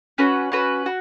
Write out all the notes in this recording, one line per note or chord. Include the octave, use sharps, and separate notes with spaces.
C#4 F#4 B4
C#4 F#4 B4
F#4